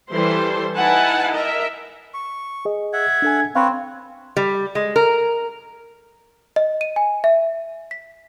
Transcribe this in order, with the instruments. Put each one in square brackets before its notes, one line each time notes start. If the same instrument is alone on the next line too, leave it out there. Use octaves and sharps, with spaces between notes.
[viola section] E3 G3 A4 C5 C6
D#4 E4 B4 F#5 G#5 A5
A#4 D#5 E5
[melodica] C#6
[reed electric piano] G#4 D#5
[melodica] E5 F#5 [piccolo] G#6
[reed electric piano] D4 A4 G#5
[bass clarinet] C4 [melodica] B4 C#5 [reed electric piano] F5 B5
[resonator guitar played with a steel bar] G3
G#3
A#4
[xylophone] D#5
D#7
G#5
E5
B6